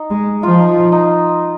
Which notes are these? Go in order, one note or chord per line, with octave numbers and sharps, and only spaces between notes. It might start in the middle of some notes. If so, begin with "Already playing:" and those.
Already playing: D#4
G#3
F3 F4
D#4
D#4